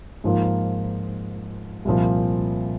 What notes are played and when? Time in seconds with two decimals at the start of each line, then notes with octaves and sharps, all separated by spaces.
0.24 G#2 F3 A#3 F4
1.85 C2 A#2 F3